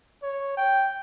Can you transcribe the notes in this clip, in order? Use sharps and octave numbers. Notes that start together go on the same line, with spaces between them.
C#5
G5